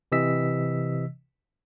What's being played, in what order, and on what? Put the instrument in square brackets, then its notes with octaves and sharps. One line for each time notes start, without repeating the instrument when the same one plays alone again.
[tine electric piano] C3 E3 D#5 E6 B6